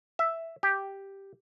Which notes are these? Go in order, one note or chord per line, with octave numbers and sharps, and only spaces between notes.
E5
G4